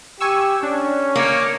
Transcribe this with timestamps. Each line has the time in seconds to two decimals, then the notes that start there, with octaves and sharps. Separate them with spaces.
0.20 G4 G#5 C#6 E6
0.63 C#4 D4
1.15 A#3 D#4 C#5 D6